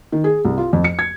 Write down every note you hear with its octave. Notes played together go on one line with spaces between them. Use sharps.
D#3
G#4
C2
F4
F2
C#7
G#6